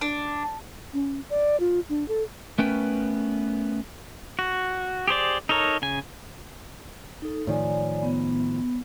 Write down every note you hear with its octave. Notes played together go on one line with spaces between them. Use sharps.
D4
C#4
D5
F4
D4
A4
A3 B3 C#4 A#4 B4 G5
F#4
G4 G#4 C5 D5
D#4 A4 A#4 C#5
C#3 G#5
D#4 A4
A2 D#3 F3 C#5 D5 G#5
B3